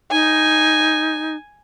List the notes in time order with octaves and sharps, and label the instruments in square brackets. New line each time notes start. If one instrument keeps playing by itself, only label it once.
[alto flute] D#4 [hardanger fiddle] G#5